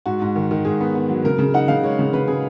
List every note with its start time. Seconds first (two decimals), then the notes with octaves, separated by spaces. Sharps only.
0.06 G#2 F#4
0.22 G#2
0.36 D#3
0.51 D#3
0.65 G#2 G#4
0.81 B3
0.95 B3
1.10 F#3
1.24 C#3 A#4
1.39 C#3
1.54 D#4 F#5
1.68 C#3 F5
1.84 G#3 C#5
1.99 C#3
2.13 C#3 B4
2.28 C#3 G#4